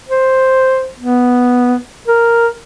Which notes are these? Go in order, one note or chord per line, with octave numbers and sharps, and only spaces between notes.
C5
B3
A#4